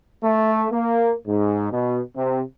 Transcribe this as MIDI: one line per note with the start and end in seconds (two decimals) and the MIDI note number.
0.23 0.67 57
0.71 1.13 58
1.27 1.69 44
1.71 2.01 47
2.16 2.40 48